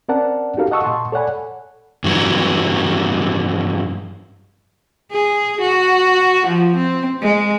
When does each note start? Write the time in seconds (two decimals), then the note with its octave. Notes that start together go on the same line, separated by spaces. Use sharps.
0.09 C4 C#4 A#4 D5 F#5 A5
0.57 D#4 F#4 G4 A4 A#4 F5
0.71 D#5 F#5 A5 C#6 D#6 E6
0.83 A#2 A5 C6 C#6
1.12 A4 C#5 D5 F#5 G#5 B5
2.04 G2 E3 F#3
5.12 G#4
5.61 F#4
6.47 F3
6.77 C4
7.22 G#3